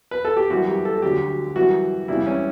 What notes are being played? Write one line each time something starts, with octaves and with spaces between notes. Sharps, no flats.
B4
A4
G4
F#2 E3 G3 F#4
G4
A4
D2 D3 F#3 G4
F#2 E3 G3 F#4
C#2 C#3 E3 G3 E4
C#4